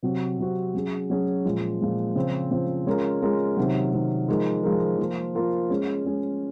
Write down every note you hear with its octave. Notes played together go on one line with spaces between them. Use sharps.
C3 F#3 C4 F#4
C3 F#3 C4 F#4
F#3 C#4 G#4
F#3 C#4 G#4
A#2 F3 G#3
A#2 F3 G#3
C#3 F3 C4
C#3 F3 C4
G#3 C#4 F4 A#4
G#3 C#4 F4 A#4
C3 D#3 F#3
C3 D#3 F#3
F3 G#3 D#4 A#4
F3 G#3 D#4 A#4
F3 A#3 F4 A#4
F3 A#3 F4 A#4
G#3 C#4 G#4
G#3 C#4 G#4